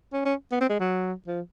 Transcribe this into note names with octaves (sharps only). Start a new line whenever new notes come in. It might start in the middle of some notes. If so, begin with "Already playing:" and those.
C#4
C#4
B3
C4
G#3
F#3
F3